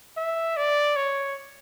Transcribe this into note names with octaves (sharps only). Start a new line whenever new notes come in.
E5
D5
C#5